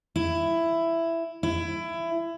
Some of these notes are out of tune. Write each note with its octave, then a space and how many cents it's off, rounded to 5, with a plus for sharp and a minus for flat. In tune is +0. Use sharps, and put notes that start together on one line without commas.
E4 +10
E4 +20